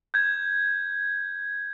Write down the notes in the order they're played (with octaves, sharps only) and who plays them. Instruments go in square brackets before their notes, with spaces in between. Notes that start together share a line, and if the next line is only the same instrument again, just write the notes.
[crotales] G6 G#6